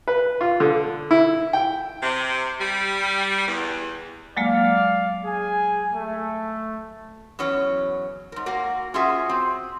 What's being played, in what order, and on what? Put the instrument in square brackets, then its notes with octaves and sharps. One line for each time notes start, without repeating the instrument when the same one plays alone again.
[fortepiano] B4
F4
D3
E4
G5
[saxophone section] C3
G3
E2
[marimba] F#3 G#3 A#3 [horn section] D5 F5
[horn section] G#4 G#5
A3
[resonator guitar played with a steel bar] E2 F#3 C#4 C#5
G#2 A#4
A#3 F#4 A#4
C#4 F4 F#4 G#4 E5
C4